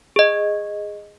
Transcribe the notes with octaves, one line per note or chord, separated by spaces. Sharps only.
G#4 D#5